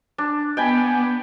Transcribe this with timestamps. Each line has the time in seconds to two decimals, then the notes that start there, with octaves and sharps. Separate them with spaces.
0.18 D4
0.57 B3 G5 G#5 B5